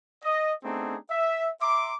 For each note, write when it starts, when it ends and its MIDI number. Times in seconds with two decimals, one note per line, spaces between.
0.23 0.52 75
0.63 0.96 57
0.63 0.96 59
0.63 0.96 60
0.63 0.96 62
0.63 0.96 63
0.63 0.96 68
1.10 1.49 76
1.61 1.94 76
1.61 1.94 82
1.61 1.94 84
1.61 1.94 86